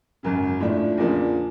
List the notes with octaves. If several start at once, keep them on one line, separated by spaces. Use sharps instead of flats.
G#1 F#2 C#3
A2 F3 A3 D4
E2 C#3 F3 A#3 D4